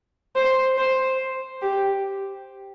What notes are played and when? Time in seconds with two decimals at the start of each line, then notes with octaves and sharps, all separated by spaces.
0.36 C5
0.78 C5
1.62 G4